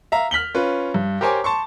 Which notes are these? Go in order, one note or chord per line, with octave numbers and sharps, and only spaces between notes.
E5 F5 A#5
F6 B6 F#7 G7
C#4 F4 B4
G2
G4 A#4 C5 C#5 G#5 D6
A5 C6 C#6